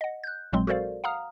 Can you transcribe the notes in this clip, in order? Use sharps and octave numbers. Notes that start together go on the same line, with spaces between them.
D#5 F#5
F#6 G6
A#1 A#2 F#3 G#3 C4 C6
F#4 A4 A#4 C5 D5 F5
F5 F#5 A#5 D#6 F6